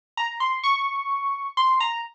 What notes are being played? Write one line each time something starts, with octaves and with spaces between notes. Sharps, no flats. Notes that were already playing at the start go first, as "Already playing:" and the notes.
A#5
C6
C#6
C6
A#5